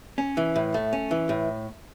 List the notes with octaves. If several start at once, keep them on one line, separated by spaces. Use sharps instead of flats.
C#4
E3
A2
A3
C#4
E3
A2